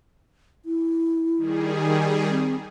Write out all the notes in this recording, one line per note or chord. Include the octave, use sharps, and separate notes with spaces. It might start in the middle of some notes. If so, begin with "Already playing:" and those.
E4
D#3 G3 G#4
C4